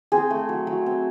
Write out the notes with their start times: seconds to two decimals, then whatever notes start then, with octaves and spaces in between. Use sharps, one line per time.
0.12 C4 G#4
0.31 A3
0.49 F#3
0.67 F#3
0.86 C4